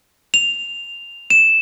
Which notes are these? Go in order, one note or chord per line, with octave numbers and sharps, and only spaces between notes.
F7
E7